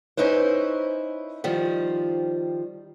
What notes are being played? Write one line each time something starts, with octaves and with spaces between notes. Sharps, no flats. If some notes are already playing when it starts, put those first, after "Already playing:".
C#4 D#4 E4 B4 C5
D#3 F3 G3